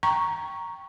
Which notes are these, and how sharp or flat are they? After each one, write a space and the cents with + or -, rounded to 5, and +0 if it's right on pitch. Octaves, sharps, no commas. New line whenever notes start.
G5 +0 A#5 +0 C#6 +0